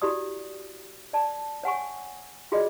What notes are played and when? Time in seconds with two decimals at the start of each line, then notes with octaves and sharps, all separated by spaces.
0.02 E4 F#4 G4 D5 D#6
1.13 D5 A5
1.63 C#5 F#5 G#5 C#6
2.52 F4 F#4 G#4 A4 D5 D#5